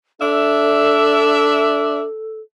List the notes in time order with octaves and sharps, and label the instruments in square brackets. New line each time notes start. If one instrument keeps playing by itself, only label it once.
[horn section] D4 E5 [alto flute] A4